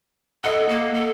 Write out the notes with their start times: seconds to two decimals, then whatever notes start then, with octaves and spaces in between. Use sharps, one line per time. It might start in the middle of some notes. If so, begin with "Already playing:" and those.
0.44 A4 D#5 F#5
0.69 A#3
0.94 A4